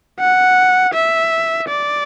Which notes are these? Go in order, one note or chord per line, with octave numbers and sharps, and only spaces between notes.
F#5
E5
D5